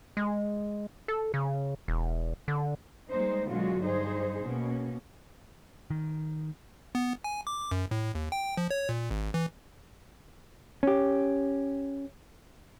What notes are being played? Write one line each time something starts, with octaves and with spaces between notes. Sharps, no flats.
G#3
A4
C#3
E1
D3
G3 G#3 A#3 D#4 C5
B2 D3 F#3 G#3 F4 F#4
G2 D#4 G#4 C5
B2 A#3 C#4
D#3
B3
G#5
D6
F#2
A2
D#2
G5
F3
C#5
A#2
G#1
E3
C#4 G4